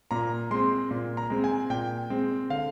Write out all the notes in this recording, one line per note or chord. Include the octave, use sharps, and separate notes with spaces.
A#2 A#5
G#3 C4 C6
A#2
A#5
G#3 C4
G#5
A#2 G5
G#3 C4
D3 F5